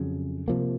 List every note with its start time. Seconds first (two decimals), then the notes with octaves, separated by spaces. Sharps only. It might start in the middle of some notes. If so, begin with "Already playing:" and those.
Already playing: F2 C#3 F#3
0.48 C3 F3 A#3